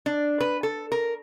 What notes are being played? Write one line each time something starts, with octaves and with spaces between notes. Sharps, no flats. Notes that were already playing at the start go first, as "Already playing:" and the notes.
D4
B4
A4
A#4